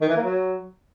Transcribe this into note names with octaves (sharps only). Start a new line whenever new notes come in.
D#3
E3
A#3
F#3